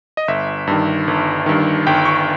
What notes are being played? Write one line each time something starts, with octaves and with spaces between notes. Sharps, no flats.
D#5
G1 E5
G2 D#3
G1
G2 D#3
G1 G5
C#6